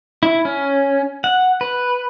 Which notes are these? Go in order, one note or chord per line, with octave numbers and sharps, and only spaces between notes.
E4
C#4
F#5
B4